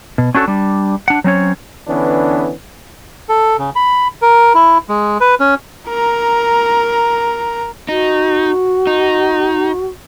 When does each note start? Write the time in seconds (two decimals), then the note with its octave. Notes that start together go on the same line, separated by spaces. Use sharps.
0.18 B2
0.35 C#4 D4 F#4 A4
0.48 G3 D4
1.08 D4 F#5
1.24 F#3 C4 C#4 C#5
1.87 D3 E3 B3 C#4 D4
3.29 A4
3.59 C#3
3.76 B5
4.22 A#4
4.55 E4
4.89 G#3
5.21 B4
5.40 C#4
5.89 A#4 A#5
7.89 D#4 F#4
8.87 D#4